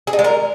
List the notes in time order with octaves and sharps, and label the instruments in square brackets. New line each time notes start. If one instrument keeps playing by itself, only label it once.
[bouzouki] G#4
D#4
G#3
A#4